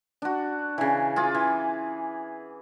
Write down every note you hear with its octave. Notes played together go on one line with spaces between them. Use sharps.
D4 F#4
C#3 E3
F4 G#4 D6
E3